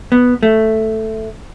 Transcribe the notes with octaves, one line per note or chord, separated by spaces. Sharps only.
B3
A3